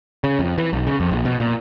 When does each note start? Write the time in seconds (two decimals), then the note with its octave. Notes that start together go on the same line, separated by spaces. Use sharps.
0.24 C#3
0.39 F2
0.58 E3
0.73 B1
0.87 C#3
1.00 F2
1.11 A#1
1.25 B2
1.40 A#2